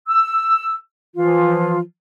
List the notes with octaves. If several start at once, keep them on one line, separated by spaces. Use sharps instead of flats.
E6
E3 F3 F4